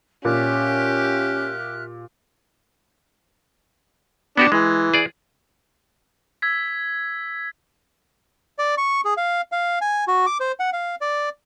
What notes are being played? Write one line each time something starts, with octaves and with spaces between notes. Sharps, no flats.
A#2 C#4 G4 E5 F6 F#6
B3 D4 F#4 G4
E3 G#3
G#4 D5
E6 G#6 B6
D5
C#6
G#4
F5
F5
G#5
F#4
D6
C5
F#5
F5
D5